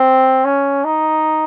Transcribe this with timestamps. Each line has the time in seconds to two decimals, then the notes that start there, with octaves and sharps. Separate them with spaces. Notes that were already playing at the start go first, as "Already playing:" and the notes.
Already playing: C4
0.45 C#4
0.85 D#4